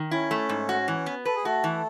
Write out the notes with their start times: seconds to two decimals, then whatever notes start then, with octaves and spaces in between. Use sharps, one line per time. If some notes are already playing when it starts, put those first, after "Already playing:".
Already playing: D#3
0.11 C#4 E4
0.31 A3
0.49 G#2
0.69 F#4
0.88 E3
1.06 B3
1.25 A4 B4
1.36 G#4
1.44 A3 F#4 A4
1.64 E3